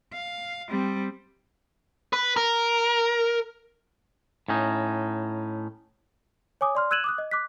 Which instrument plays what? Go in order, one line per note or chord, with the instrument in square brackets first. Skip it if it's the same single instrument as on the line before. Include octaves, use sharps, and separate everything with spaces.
[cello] F5
G3 C4
[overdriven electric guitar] B4
A#4
[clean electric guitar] A2 C#4 D#4
[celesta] C#5 G#5 D6 D#6
D5 C6 F6
E6 F#6 G#6 D#7 E7 F#7
D6 D#6 F#6
D#5
D6 F#6 B6